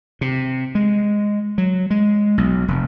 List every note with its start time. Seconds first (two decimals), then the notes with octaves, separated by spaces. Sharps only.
0.21 C3
0.75 G#3
1.58 F#3
1.90 G#3
2.38 B1
2.68 F1